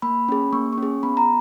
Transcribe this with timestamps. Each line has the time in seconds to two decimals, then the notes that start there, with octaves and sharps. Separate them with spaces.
0.02 A#3 B5
0.29 C#4 G#4
0.53 A#3 C#6
0.73 C#6
0.78 C#4 G#4
1.03 B3 B5
1.17 A#5